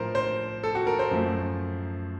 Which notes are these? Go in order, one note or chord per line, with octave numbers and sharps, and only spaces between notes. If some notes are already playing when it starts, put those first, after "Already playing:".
Already playing: A2 F3 A#4 C5
C5
A4
F#4
A#4
C5
F#2 F3 A3